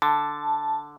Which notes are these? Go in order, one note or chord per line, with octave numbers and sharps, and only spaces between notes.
D3 A5